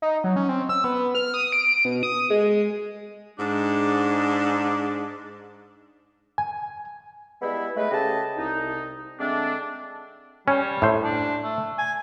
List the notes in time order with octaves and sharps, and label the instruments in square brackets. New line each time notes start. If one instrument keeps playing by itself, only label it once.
[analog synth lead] D#4
F#3
C#4
C4
E6
B3
F6
D#6
D7
B2
D#6
G#3
[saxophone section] G#2 D4
[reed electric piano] G#5
[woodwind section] G3 G#3 B3 E4
G#3 A3 B4
C#3 A3 G4 G#4 D#5 A5
C2 D#4
D3 G#3 A3 C4 D4
[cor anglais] G3 [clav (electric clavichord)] C#4
[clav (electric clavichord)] A2 C5
[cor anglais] D4
A3
G#5